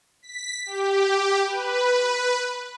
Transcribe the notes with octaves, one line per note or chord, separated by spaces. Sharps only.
B6
G4
B4